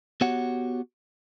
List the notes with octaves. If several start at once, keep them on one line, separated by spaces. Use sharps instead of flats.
B3 F#4 G4 C#5 F#5